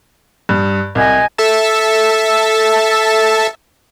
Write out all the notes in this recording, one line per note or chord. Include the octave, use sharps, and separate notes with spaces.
G2
C2 D#5 G#5 G#6
A4 E5 A5